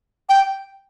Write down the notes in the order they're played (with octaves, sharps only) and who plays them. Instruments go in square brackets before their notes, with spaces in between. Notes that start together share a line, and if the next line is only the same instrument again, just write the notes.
[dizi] G5